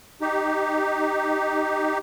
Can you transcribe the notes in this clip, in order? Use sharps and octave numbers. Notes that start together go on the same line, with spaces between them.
D#4 G4